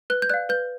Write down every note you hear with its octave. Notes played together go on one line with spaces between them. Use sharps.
B4 F#6
G6
D5 F5 F#6
B4 G6